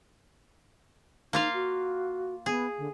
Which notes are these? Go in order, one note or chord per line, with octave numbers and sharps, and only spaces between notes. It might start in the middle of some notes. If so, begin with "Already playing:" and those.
A#3 D#4 F4 F5
F#4
B3 G#4
D3